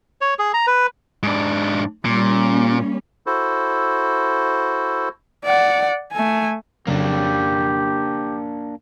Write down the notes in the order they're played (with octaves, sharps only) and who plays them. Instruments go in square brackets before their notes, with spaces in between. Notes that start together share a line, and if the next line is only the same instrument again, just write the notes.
[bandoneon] C#5
G#4
A#5
B4
[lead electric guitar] G#2 D4
[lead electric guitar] A#2 [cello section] G3 A#3 C#4
[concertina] E4 F#4 A4 C5
[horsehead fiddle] D5 F#5
A3 G#5
[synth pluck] F2 C#3 F#3 [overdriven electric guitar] A#3 D4 [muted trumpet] G4